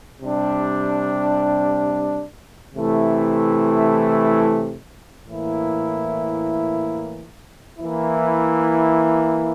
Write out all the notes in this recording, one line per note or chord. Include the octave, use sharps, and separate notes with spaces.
C3 G3 D4
C3 E3 A3 E4
A2 E3 A#3 E4
E3 A#3 E4